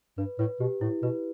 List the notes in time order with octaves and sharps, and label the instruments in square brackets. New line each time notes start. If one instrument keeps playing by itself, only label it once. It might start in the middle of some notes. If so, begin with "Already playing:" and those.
[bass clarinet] G2 [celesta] B4
[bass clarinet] A2 [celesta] B4
[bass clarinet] B2 [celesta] G4
[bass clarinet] A2 [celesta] E4
[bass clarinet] B2 [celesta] B4